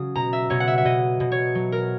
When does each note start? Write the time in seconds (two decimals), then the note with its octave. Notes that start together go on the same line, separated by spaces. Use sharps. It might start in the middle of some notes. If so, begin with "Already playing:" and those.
Already playing: C#3 F#3 D#6
0.15 B2 A#5
0.33 E5
0.50 B2 C#5
0.60 F#5
0.68 E5
0.78 E5
0.85 B2 D#5
1.20 B2
1.32 C#5
1.55 F#3
1.72 A#4